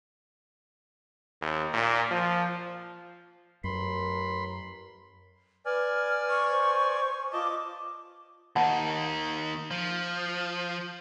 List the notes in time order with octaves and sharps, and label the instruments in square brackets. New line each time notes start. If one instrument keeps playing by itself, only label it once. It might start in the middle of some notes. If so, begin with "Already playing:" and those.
[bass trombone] D#2
A#2
F3
[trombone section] A1 A#4 [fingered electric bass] F#2 [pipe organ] B5 C6
[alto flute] B4 [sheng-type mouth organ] D5 G#5 [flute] F6
[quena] C#6
[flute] C5
[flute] F4 [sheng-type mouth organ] D#5 A5 [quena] D6
[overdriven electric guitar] D#2 D#3 [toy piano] F#5 A5 B5
[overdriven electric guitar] F3